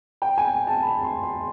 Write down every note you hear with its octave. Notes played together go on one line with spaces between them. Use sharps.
G5
G#5
A5
B5
C6
C6